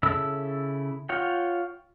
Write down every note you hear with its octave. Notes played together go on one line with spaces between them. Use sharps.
C#3 E4 A4 E6
F4 C#5 F#5 G5